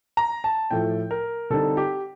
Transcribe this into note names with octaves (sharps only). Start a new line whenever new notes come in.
A#5
A5
A2 F3 A3 G5
A#4
D3 G3 C4 D#4 A4
G4